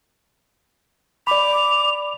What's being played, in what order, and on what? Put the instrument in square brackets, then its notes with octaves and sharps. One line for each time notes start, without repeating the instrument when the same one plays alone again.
[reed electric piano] D5 B5 [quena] D6 [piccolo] F7